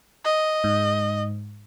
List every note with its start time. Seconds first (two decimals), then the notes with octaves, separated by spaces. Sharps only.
0.25 D#5
0.64 G#2